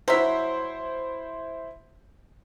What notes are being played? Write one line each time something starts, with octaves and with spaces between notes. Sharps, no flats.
F#3 E4 C5 E5